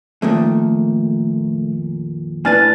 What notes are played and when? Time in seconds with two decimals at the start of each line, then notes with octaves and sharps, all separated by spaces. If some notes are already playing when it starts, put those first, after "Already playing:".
0.22 F2 A#2 D#3 A3
2.45 A2 D4 B4 G#5 F6 A6